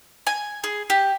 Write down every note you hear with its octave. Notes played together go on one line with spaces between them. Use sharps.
G#5
G#4
G4